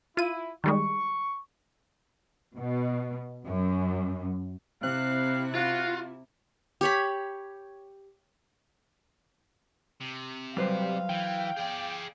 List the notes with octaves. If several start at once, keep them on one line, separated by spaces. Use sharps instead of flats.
E4 F4 D#7
D#3 G3 G#3 C#6
B2
F#2
C3 C4 E4 F5 F#6
F4 F#4
G4 C#5 B5
C3
F#3 G3 B4 C5 F5
E3 G5
G#4 D5